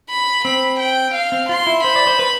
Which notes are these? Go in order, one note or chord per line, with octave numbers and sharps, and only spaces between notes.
B5
C4 B5
G5
F5
C4
F4 C6
E4
C5 B5
D5
C5
B4